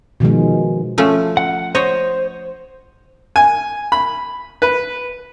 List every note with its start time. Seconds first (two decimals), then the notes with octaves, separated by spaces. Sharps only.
0.20 B2 D#3 F3 G#3
0.98 F3 A3 C#4
1.37 F#5
1.75 C5 C#5 D#5
3.36 G#5
3.92 B5
4.62 B4